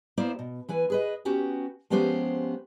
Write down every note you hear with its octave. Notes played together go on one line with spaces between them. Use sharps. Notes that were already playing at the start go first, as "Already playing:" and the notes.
A#3 B3 E4 C5 D5
B2
E3 B4 G#5
G#4 B4 D#5
B3 C#4 F#4 G4
F3 G#3 B3 C#4 G4 C5